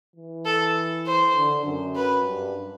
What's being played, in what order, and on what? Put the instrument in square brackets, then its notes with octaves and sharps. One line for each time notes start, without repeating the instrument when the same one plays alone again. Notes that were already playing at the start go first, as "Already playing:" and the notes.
[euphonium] E3
[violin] A4
C5
[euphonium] D3
F#2
[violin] B4
[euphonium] G2